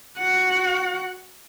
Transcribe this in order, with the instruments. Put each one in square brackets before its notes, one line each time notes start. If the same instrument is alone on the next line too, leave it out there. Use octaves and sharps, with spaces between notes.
[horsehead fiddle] F#4 F#5